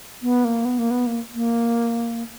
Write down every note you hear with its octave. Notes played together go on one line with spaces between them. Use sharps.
B3
A#3
B3
A#3
B3
A#3
A#3